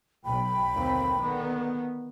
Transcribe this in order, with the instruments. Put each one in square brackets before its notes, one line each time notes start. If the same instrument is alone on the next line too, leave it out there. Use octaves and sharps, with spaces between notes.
[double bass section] B1 [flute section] G5 B5
[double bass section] D#2 D3 C4
D3 D#3 B3